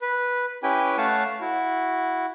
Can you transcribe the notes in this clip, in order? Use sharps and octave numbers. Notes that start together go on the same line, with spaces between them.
B4
C#4 E4 G4 B4 G5 G#5
A3 C#5 F5 F#5 A5
E4 F#4